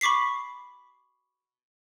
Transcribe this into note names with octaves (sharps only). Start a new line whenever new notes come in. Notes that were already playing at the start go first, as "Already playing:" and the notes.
B5 C#6 D6 B6 C7